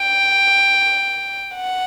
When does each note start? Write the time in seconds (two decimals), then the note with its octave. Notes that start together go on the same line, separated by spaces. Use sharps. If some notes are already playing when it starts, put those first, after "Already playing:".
Already playing: G5
1.54 F#5